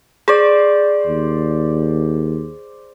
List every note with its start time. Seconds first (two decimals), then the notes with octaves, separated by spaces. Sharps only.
0.28 G#4 C5 D5
1.07 D#2